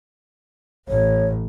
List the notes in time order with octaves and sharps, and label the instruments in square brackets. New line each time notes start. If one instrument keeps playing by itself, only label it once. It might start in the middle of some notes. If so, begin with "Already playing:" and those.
[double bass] A1 [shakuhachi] C#5